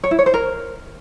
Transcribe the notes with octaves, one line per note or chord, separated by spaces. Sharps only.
C#5
E4
C#5
C5
A#4